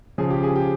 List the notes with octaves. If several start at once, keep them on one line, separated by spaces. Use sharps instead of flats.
C#3 F3 G#4
G4
G#4
G4